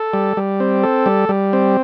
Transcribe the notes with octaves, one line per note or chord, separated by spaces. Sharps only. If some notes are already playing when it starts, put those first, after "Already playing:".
Already playing: A4
G3
G3
C4
A4
G3
G3
C4